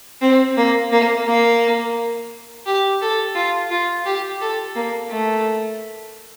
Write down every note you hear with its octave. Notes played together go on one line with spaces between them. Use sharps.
C4
A#3
A#3
A#3
G4
A4
F4
F4
G4
A4
A#3
A3